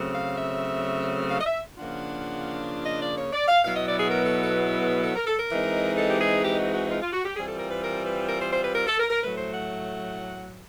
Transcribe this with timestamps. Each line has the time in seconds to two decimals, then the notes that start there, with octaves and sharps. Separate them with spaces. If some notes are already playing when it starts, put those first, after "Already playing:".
Already playing: C#3 F#3 A3 C4
0.14 F5
0.38 E5
1.30 F5
1.40 D#5
1.46 E5
1.77 C#3 F3 A#3 D4 F4 F#5
2.86 D#5
3.02 D5
3.18 C#5
3.33 D5
3.48 F5
3.63 B2 F#3 B3 E4 F5
3.76 D#5
3.87 D5
3.98 G#4
4.10 A#4
4.25 A4
4.42 A4
4.57 G#4
4.80 G#4
5.04 A4
5.16 A#4
5.26 A4
5.38 A#4
5.51 E3 G#3 C4 D#4
5.97 A4
6.10 G4
6.20 G#4
6.43 G4
6.58 F#4
6.74 F#4
6.90 F4
7.01 F4
7.12 F#4
7.25 G4
7.36 E3 G3 C4 F4 G#4
7.48 A4
7.59 A#4
7.71 B4
7.83 A#4
8.06 B4
8.29 A#4
8.40 C5
8.53 C5
8.64 B4
8.75 A#4
8.87 A4
9.00 A#4
9.10 A#4
9.22 A2 F#3 A3 B4
9.38 C5
9.53 F#5